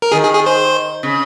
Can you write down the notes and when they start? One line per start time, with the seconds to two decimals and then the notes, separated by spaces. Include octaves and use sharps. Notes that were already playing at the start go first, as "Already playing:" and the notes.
0.02 A#4
0.12 D#3 G#4
0.23 G#4
0.35 G#4
0.46 C5
1.03 C#3